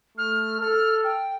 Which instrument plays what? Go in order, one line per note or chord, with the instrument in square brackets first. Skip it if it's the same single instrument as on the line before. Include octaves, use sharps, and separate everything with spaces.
[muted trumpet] A3 [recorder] F6
[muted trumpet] A4 [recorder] F6
[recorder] G5